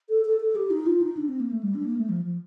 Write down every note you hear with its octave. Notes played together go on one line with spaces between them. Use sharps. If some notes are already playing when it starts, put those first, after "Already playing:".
A4
A4
A4
G4
D#4
F4
D#4
D4
C4
A#3
A3
G3
D4
A#3
A3
F3
F3